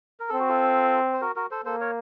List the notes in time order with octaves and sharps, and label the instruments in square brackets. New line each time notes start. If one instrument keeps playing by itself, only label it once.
[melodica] A#4
[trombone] C4 [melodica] A4
[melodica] F#4
F4 A4
C5
F#4 A#4
F#4 A#4
A4 C5
[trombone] A#3 [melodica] A4 C5
[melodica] A#4 C#5